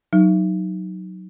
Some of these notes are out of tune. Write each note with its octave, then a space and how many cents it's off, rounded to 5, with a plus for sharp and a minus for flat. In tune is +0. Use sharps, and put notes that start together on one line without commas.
F#3 +0 D#4 +0